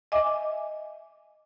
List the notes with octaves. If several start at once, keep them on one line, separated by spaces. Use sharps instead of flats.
D#5 E5 G#5 D6